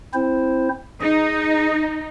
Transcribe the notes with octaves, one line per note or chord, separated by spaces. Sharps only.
C4 E4 C5
D#4 G#4